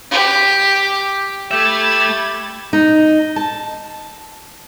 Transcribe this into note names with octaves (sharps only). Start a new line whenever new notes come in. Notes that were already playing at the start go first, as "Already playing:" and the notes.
G4
A3 G4 E5 B5 G#6 A6
D#4
A5